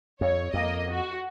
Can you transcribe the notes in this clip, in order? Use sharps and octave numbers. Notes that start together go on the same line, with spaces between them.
F2 C#5
F2 A#3 D#5
F#4